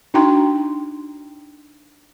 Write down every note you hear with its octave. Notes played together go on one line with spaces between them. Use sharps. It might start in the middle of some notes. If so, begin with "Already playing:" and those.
D4 D#4 F#4 G5 A#5 C6